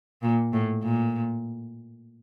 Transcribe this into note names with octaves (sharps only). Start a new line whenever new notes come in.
A#2
A2
A#2